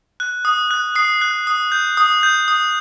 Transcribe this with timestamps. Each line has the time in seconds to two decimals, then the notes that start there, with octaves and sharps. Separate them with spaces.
0.20 F#6
0.45 D#6
0.71 F#6
0.96 D#6 C7
1.21 F#6
1.47 D#6
1.72 G6
1.97 D#6
2.23 G6
2.48 D#6